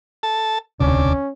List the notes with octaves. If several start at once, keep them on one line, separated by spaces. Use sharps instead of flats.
A4 A5
E1 D2 C3 C#4 D4